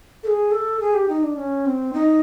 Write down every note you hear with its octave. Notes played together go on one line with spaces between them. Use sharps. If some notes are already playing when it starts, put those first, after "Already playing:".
A4
G#4
A4
G#4
G4
D#4
D4
C#4
C4
D#4